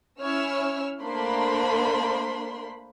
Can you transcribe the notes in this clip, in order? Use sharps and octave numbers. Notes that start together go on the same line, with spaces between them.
C#4 E4 C#5 E6 F6
A3 A#3 D4 C5 B5 C6